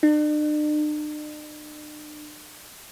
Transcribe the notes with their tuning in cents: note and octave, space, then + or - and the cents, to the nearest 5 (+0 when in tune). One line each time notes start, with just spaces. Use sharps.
D4 +45